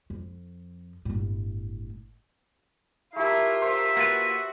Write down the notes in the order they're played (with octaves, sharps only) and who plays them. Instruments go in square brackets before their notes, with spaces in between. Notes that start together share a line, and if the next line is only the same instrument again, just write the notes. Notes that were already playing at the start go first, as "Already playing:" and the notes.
[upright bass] F2
G1 A2
[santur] A3 G4 [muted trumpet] E4 [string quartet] F4 A#4
[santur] C5 [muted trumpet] E5
[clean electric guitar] A#3 F4 B4 [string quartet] F#4